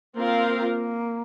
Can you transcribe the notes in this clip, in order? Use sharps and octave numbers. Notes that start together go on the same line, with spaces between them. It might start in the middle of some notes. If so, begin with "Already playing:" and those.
A#3 C4 F4 A#4 F5